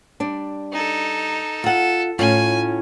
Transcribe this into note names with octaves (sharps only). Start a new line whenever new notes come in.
G3 D4
D#4 A4
F4 A4 F#5
A2 C#4 F4 G#5